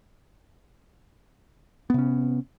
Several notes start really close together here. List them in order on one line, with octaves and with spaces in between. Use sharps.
B3 C3 C#4